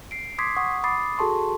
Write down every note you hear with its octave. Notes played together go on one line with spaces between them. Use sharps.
C7 D7
C6 D6 D#6 G#6 B6 C7
F#5 C#6 D#6
B5 D6 D#6 A6 C7
F#4 G#4 A4 A5 C6 C#6